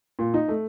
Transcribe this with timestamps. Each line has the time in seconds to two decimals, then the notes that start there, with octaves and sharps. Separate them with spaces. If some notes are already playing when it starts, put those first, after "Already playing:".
0.19 A#2
0.34 D#4
0.48 A3